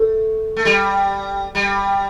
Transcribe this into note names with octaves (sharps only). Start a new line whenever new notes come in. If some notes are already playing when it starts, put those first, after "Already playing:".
Already playing: A3
A3
G3
G3